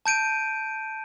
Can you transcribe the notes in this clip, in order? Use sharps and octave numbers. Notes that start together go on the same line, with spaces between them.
A5 G6 D7 D#7